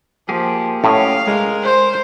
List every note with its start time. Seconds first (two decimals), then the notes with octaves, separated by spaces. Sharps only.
0.29 F3 A#3 G4 G#4
0.84 A2 C#4 F#4 G4 D#5 F5
1.27 G#3 A#4
1.63 C5